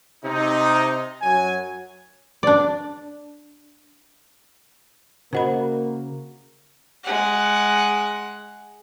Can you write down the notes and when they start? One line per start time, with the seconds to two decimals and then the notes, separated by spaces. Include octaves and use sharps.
0.23 C3 D#4
1.21 F#2 F#3 G#5
2.43 D4 D5
5.33 C#3 A#3 F#4 C5 D#5 B5
7.04 G#3 F#5